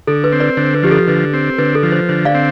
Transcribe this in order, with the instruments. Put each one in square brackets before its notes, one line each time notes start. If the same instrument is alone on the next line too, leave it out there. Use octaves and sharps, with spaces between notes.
[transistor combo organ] D3 [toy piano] A4
[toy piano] B4
[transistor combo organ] C4
[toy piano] B4 D5
[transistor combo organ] D3 [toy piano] C5
[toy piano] B4
[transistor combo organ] F3 [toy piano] G4
[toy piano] A4
[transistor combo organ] D3 [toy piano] B4
[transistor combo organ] C4
[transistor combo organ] D3 [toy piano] B4
[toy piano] A4
[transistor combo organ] F3
[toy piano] C5
[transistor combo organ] D3 [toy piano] C5
[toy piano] D5 F5
[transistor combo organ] C4